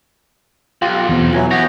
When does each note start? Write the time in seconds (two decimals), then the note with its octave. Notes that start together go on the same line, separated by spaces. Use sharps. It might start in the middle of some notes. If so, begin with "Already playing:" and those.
0.82 B1 F4 G4
1.09 E2 B2 C4
1.34 E3 F#3 G#5
1.51 B3 G4 C#5 A#6